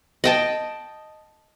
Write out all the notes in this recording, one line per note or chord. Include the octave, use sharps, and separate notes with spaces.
D#5 G5 A5